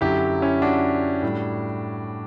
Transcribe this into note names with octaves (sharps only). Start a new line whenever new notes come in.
F#2 D3 F#3 E4 G4
C#4 E4
D4 F#4
A2 G3